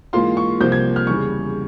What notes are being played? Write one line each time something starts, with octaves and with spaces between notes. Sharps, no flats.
G#2 E3 A#3 F4 C6
C#6
C2 C3 F3 A#3 G6
G#6
F6
E2 C#3 G3 C#6